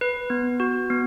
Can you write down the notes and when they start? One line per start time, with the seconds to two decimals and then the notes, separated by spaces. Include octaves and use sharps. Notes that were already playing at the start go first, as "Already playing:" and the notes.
0.01 B4
0.30 B3
0.60 F#4
0.90 B3